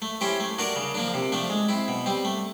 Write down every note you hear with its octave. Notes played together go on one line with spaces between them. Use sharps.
A3
C#4 E4 G4 C5
A3
D4 F#4 A#4 D5
C#3
F3 A#3 D4
C3
F3 A3 D4
G#3
C4 E4
B2
G3 C4
A3